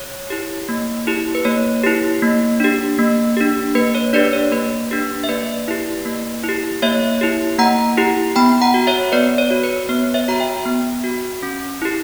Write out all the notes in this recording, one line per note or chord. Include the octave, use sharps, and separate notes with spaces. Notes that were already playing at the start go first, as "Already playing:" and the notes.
Already playing: C#5
E4 G4
A#3
E4 G4
B4
A#3 C#5
E4 G4
A#3
D4 G4
A#3
D4 G4
A#3 B4
C#5
D4 G4 B4 D5
C#5
A#3 B4
D4 G4
E5
A#3 B4 D5
E4 G4
A#3
E4 G4
A#3 C#5 E5
E4 G4
A#3 F#5 A#5
E4 G4
B3 G5 B5
F#5 A#5
F#4
C#5 E5
B3 B4 D5
C#5
F#4
B4
B3 C#5
C#5 E5
F#4 A#5
E5 G5
B3
F#4
C#4
E4 G4